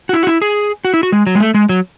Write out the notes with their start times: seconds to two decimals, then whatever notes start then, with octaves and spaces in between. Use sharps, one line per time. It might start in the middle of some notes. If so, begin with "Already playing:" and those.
0.09 F#4
0.13 E4
0.23 F#4
0.27 E4
0.42 G#4
0.85 F#4
0.94 E4
1.03 F#4
1.12 G#3
1.27 F#3
1.35 G#3
1.40 A3
1.54 G#3
1.69 F#3